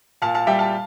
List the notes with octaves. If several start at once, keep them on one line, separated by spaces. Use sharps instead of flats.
A#2 F5 A5
F5 A5
G3 E5 G5
F5 A5